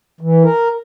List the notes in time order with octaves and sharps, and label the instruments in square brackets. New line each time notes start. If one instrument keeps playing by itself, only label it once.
[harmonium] E3
A#4